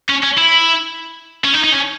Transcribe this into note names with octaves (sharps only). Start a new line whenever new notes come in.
C#4
C#4
E4
C#4
D#4
D#4
C#4